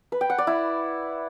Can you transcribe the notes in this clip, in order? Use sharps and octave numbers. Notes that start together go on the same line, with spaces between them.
B4
G5
F#5
D5
E4